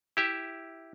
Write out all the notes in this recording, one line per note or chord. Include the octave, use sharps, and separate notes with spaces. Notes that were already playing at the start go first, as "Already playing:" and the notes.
E4 G4 E5